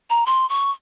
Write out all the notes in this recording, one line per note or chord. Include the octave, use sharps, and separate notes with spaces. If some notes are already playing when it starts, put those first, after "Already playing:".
A#5
C6
C#6